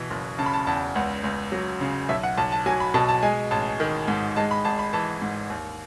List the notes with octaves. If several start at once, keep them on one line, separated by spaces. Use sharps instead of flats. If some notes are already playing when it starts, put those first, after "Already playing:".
Already playing: B2 E3
F#1
C#3 A5
B5
A5
E2 A5
C#2 F#5
C#2
F#3
C#3
B1 E5
F#5
B1 A5
A5
F#3 G#5
B5
B2 A5
A5
G#3 G#5
A1 A5
D#3
G#2
G#3 A5
B5
G#1 A5
B5
E3 A5
G#2
D#2